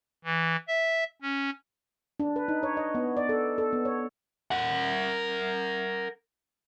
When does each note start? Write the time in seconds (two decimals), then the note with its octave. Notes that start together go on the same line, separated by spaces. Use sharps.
0.24 E3
0.68 E5
1.22 C#4
2.20 D4
2.36 B4
2.48 D#4
2.63 C#5
2.77 D#5
2.95 B3
3.17 D5
3.29 A4
3.58 A4
3.73 B3
3.85 C#5
4.51 A#4 F#5